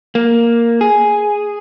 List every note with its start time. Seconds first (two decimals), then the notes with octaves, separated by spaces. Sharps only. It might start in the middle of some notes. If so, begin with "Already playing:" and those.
0.15 A#3
0.81 G#4